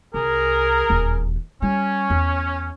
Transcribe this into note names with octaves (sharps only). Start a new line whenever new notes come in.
C2 G#4 A#4
D#1 E2
G3 C#4
E2